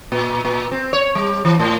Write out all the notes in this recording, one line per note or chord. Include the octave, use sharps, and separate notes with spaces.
A#2
A#2
C4
C#5
G3
E3
A2